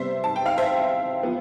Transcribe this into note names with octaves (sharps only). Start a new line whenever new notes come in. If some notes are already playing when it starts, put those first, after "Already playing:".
Already playing: C3 G3 B3 C5 E5
A5
G5
F5
C5 E5
F3 B3